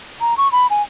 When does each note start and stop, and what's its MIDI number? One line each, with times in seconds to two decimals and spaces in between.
0.21 0.37 82
0.37 0.50 85
0.52 0.67 83
0.70 0.82 80